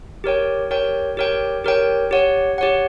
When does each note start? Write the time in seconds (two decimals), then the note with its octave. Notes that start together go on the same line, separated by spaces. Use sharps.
0.24 G4 A#4 C#5 G5
0.71 G4 A#4 C#5 G5
1.17 G4 A#4 C#5 G5
1.65 G4 A#4 C#5 G5
2.11 G4 C#5 F#5
2.58 G4 C#5 F#5